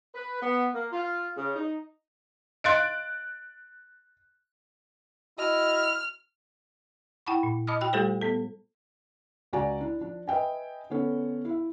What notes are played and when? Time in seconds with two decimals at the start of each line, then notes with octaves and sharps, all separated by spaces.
0.15 B4
0.42 B3
0.75 A#3
0.92 F4
1.37 C#3
1.55 D#4
2.64 D#5 F5 C6 F#6 A6 D7
5.38 E4 F#4 D#5 F6
7.27 E4 F#5 G5 A5 B5 C#6
7.43 A#2
7.67 D#5 A5 B5 D6 D#6 F6
7.81 F#4 G5 B5 F#6
7.93 G3 A3 F4 G4 A4 C5
8.21 B3 A4
9.53 C#2 F#4 D5 G#5 A#5
9.81 D4 E4
10.01 F3 D4
10.27 B4 D#5 E5 G5 G#5
10.90 D3 B3 C#4 A4
11.45 E4 E5